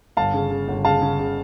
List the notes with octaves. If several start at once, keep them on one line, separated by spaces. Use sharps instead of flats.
G1 F5 A5
C#3
C#3
G1
C#3 F5 A5
C#3
C#3